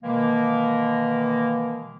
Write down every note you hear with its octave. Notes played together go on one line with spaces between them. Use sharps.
B2 D#3 E3 G#3 A#3